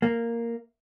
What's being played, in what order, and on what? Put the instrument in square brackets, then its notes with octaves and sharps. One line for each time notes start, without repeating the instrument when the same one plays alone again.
[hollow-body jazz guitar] A#3